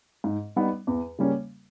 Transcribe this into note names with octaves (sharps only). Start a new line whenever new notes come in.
G#2
G3 B3 D#4
E2
C#3 G3 A#3 C#4